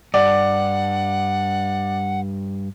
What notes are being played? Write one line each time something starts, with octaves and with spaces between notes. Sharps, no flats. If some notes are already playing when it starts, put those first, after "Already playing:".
G2 D5 F#5